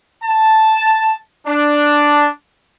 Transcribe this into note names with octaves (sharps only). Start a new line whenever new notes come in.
A5
D4